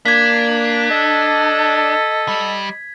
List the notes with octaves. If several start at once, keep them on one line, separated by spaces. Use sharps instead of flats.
A#3 D4 G#6 B6
A4 D#5
G3